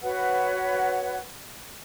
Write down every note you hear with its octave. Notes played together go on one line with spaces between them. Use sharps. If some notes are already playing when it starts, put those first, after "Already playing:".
F#4 B4 C#5 F#5